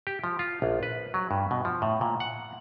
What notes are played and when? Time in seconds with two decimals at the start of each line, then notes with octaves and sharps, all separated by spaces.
0.07 G4
0.24 F3
0.39 F4
0.62 A#1
0.83 B4
1.14 F#3
1.31 G2
1.51 B2
1.65 F3
1.82 A2
2.01 A#2
2.20 F#5